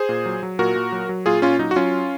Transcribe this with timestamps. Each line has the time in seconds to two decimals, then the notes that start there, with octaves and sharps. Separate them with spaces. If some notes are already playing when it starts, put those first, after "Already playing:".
Already playing: G#4 C5
0.09 A#2
0.26 F#3
0.43 F#3
0.59 A#2 F#4 A#4
0.76 A#2
0.92 F#3
1.09 F#3
1.26 A#2 F4 G#4
1.42 A#2 C#4 F4
1.59 F#3 D#4
1.71 F#4
1.76 F#3 C#4 F4